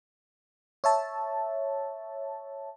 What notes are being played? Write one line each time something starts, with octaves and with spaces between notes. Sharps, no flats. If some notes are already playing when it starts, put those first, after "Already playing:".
C#5 E5 A5